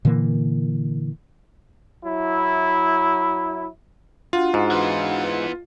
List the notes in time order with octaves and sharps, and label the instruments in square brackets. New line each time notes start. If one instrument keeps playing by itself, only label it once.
[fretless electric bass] A#2 D3 E3 A#3
[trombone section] F#3 E4
[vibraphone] D4 F#4 F#5 [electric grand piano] F4
[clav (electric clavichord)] G#2
[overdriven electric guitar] E3 B3